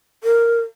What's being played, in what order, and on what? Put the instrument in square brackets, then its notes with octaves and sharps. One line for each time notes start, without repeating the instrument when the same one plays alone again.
[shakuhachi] A#4